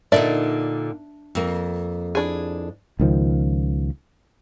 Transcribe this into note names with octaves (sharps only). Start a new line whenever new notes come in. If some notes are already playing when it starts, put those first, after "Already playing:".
A#2 D3 D4 D#4 D5 E5
F2 A#3
D4 E4 G#4
C#2 D#3 F3